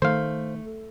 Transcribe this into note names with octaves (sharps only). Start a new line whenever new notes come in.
D#3 A3 C5 F5